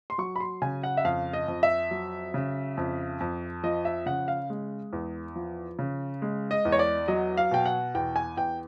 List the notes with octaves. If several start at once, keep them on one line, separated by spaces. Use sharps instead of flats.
C6
F#3 C#6
B5
C6
C#3 G#5
F#5
E5
F2 F5
D#5
F2
E5
F#3
C#3
F2
F2
F3 D#5
E5
C#3 F#5
F5
G#3
E2
F3
C#3
G#3
D#5
E2
C#5
D5
F#3 D#5
F5
B2 G5
F#5
E2 G5
G#5
E2 G5